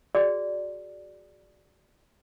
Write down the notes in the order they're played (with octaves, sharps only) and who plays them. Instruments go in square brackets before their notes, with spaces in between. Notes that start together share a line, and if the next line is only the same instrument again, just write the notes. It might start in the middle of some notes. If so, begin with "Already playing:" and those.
[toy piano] F#4 G#4 D5